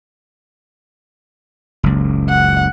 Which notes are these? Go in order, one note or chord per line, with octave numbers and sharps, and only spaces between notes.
F#1 C#2
F#5